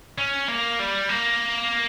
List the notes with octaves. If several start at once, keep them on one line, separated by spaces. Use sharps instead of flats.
C#4
A#3
G3
A#3